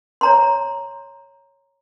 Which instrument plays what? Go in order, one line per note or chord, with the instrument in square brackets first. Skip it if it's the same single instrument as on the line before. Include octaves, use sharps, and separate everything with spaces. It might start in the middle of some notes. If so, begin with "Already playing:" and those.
[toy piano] C#5 A#5 C6